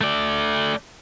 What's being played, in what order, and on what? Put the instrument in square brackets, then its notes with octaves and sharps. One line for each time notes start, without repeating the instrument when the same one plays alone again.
[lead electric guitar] A3 D5